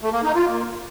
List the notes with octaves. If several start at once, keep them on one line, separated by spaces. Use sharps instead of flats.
A3
A#3
D#4
F4
A#3